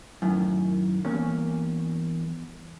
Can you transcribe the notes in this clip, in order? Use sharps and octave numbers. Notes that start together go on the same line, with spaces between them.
F#2 A2 D#3
E2 G2 A#3 C#4